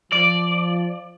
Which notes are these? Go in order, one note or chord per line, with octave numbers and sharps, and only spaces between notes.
F3 D5